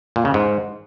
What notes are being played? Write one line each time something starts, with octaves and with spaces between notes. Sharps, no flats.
A#2
C#3
G#2